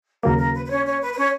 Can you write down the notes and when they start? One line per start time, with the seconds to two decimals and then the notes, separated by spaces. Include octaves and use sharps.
0.23 D#2 C#3 F#3 A#3 A#4
0.39 A#4
0.54 B4
0.65 B4
0.70 C#4 C#5
0.86 C#4 C#5
1.01 B4
1.13 B4
1.17 C#4 C#5